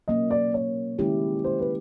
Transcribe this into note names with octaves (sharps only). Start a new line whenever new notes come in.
B2 F#3 A#3 C#4 D#5
D5
C#5
D#3 G#3 C#4 E4 G4
C5
B4